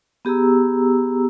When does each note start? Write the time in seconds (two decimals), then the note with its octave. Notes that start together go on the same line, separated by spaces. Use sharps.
0.25 B3 G4 G#4 A#5 E6